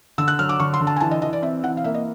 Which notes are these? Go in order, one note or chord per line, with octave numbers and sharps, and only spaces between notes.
D3 E6
F#6
F#3 F6
D6
D3 C#6
C6
D3
A5
G#5
E3 A5
D#5
E3 D#5
D5
C4 E5
E3 F#5
F5
A#3 E5
D#5